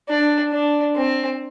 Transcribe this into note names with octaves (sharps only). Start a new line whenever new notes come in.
D4
D4
C4